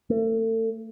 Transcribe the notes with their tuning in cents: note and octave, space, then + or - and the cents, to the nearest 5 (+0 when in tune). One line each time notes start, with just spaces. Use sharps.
A3 +35